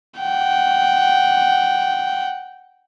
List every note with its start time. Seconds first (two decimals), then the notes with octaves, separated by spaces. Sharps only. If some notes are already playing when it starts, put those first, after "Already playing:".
0.20 F#5 G5